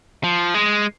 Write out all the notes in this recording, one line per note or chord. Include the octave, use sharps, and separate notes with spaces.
F3
G#3